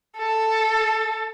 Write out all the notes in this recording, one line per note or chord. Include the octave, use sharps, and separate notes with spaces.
A4